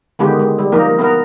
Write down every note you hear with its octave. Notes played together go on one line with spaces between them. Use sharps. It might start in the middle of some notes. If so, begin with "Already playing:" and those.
D3 D#3 G#3 B3 G4
G#3
G3
F3 A#3 D#4 A#4
B3 A#4